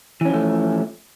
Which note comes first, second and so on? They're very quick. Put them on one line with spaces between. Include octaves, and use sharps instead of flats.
E3 C#4 F3 A3